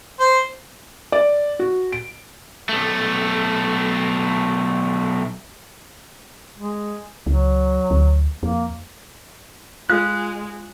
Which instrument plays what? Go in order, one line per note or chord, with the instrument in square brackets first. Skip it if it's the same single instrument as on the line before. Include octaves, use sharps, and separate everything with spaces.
[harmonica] C5
[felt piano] D5
F#4
D7
[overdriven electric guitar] B1 A3
[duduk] G#3
[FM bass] C#2 [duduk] F#3
[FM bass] D2
[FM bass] F2 [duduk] A#3
[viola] G#3 [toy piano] F4 F5 D#6 [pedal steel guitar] F#6